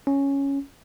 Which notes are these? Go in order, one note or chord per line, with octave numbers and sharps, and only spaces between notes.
C#4